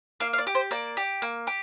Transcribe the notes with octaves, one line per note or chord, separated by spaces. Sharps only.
A#3 F5
F5
D5
G4
C5
A#3 D5
G4
A#3
G4